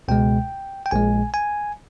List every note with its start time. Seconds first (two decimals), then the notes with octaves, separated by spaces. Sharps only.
0.08 C#2 B2 G#3 G5
0.86 G5
0.91 A#1 A#2 G#3 G#5
1.34 G#5